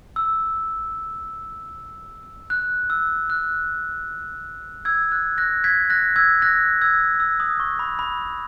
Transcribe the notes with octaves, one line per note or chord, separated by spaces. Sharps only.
E6
F#6
E6
F#6
E6 G#6
F#6
F#6 A#6
G#6 B6
F#6 A#6
E6 G#6
F#6 A#6
E6 G#6
E6
D#6
C#6
B5
B5